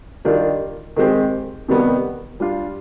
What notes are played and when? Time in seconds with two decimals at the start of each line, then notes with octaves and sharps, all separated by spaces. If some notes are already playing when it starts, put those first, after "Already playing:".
0.25 D#3 G3 D4 F4
0.96 D#3 G#3 C4 G4
1.68 C3 D#3 G3 B3
2.40 G3 D4 F4